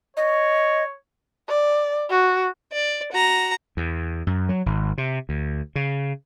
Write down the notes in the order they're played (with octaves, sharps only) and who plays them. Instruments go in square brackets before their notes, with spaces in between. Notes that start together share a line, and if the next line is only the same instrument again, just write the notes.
[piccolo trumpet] C#5 [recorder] D#5
[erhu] D5
F#4
[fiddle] D5
F#4 A#5
[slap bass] E2
F#2
F#3
G#1
C3
D2
C#3